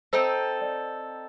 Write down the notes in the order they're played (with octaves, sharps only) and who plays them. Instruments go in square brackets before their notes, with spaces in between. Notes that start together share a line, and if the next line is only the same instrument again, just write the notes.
[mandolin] C4 D#4 A4 [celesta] C5
[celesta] D5